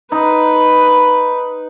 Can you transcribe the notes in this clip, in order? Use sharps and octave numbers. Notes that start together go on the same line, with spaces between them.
D#4 B4